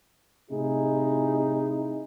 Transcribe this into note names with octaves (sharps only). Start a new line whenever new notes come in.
A2 C3 D#4 E4 G#4